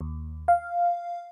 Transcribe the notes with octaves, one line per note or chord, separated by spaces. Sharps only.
D#2
F5